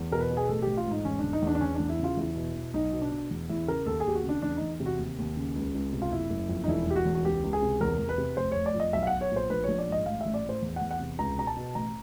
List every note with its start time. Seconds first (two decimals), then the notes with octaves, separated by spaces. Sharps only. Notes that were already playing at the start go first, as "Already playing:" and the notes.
Already playing: E2
0.12 B2 A#4
0.20 B4
0.30 B2
0.37 G#4
0.48 A1 A4
0.62 A1 G4
0.77 F4
0.86 G#2
0.91 D#4
1.05 E1 C#4
1.19 E1 D4
1.33 D#4
1.42 E2 D4
1.55 D4
1.61 E2 C#4
1.75 E2 D4
1.89 E4
1.99 C#3 F4
2.17 E2 E4
2.36 B2
2.56 B2
2.74 B1 D#4
2.92 B2
3.01 D4
3.11 B2
3.31 E2
3.50 E2 E4
3.67 C#3 A#4
3.86 D#2 A4
4.00 G#4
4.06 D#2 G4
4.15 F#4
4.24 C#3
4.29 D4
4.42 E2 D4
4.57 E2 D#4
4.80 C3
4.86 F#4
4.99 D#2
5.19 D#2
5.37 C#3
5.56 C#2
5.75 C#2
5.93 C3
6.02 F4
6.12 F#1 E4
6.30 F#1
6.49 F2
6.64 D#4
6.68 E1 E4
6.87 E1 G4
6.96 F#4
7.06 E2
7.15 F#4
7.25 C#2 G4
7.44 C#2
7.53 G#4
7.62 C3
7.81 E2 A#4
7.99 E2
8.09 B4
8.18 C3
8.37 F1 C5
8.52 F1 C#5
8.66 D5
8.74 F2
8.80 D#5
8.93 B1 E5
9.03 F5
9.07 B1 F#5
9.21 C#5
9.31 A#2 C5
9.50 A#1 B4
9.64 A#1 C#5
9.79 D5
9.88 G#2 D#5
10.06 A1 F5
10.21 A1 E5
10.34 D5
10.44 A2 C5
10.62 E2
10.76 E2 F#5
10.91 F#5
10.99 C3
11.19 C#2 A#5
11.38 B2 A#5
11.47 A5
11.57 B2
11.75 A1 A#5